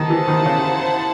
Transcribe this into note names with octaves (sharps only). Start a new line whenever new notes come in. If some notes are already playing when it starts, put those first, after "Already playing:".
Already playing: D#3 E4 C5 F#5 A5
E3
D#3
C#3